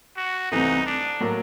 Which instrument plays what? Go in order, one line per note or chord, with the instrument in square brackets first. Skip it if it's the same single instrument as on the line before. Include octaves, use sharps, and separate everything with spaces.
[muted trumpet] F#4
[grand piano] C2 C3 E3 A3 [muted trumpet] D#4
[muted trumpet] D4
[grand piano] A2 F#3 A#3